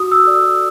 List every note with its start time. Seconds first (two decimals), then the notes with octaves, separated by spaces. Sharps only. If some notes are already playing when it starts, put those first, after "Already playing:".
Already playing: F#4 D#6
0.12 E6
0.24 A4 D5